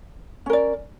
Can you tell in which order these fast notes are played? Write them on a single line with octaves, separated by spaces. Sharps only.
C#4 A#4 D5